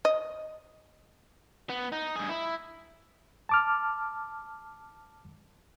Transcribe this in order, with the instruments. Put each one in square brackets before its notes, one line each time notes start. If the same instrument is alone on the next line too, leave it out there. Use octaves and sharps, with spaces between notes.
[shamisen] D#5
[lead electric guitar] B3
D#4
G2 G#4
E4
[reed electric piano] A5 D6 F6